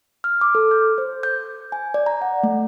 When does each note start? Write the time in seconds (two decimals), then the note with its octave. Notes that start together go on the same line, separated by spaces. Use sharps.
0.24 F6
0.41 D6
0.55 A4
0.71 G6
0.98 C5
1.23 G6
1.72 G#5
1.94 D5
2.06 A#5
2.22 F#5
2.43 A3